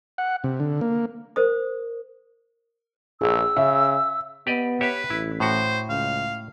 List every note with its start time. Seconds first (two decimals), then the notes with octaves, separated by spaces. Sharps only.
0.18 F#5
0.44 C3
0.60 D3
0.81 A#3
1.36 A#4 C5 D#6
3.21 A#1 G#4 E6
3.57 C#3 E5
4.47 B3 G4 D5 D#5
4.81 G4 B4 C#5 E5
5.10 A1 E4
5.40 A2 F#4 C5
5.90 C#2 F5